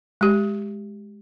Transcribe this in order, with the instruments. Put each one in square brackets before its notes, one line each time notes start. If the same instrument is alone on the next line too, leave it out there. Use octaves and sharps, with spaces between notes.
[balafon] G#3 G4